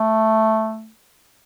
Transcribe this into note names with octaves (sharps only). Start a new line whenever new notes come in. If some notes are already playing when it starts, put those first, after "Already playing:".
Already playing: A3